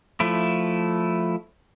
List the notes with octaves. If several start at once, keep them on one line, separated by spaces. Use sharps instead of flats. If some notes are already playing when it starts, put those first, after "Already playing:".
F3 A3 E4